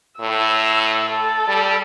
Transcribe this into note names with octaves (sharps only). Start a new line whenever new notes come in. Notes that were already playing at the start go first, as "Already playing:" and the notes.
A2 E6
A4
G3